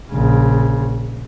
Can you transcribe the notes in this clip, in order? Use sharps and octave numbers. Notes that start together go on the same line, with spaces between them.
A#1 C#3